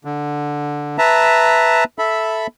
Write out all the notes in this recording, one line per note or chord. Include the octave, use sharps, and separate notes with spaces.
D3
B4 E5 A5 A#5
A4 E5 B5